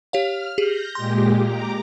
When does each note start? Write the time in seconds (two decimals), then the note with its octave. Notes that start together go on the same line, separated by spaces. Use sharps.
0.13 G4 C#5 F5 F6
0.58 G4 G#4 G6 A#6
0.95 A#2 G#3 G4 C6
1.41 A#5 D6